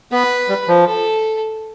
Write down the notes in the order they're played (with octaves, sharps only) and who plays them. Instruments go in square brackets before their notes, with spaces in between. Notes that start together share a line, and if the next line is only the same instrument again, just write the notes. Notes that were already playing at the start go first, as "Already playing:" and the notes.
[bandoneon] B3 [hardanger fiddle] B4
[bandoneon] G3
F3
[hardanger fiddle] A4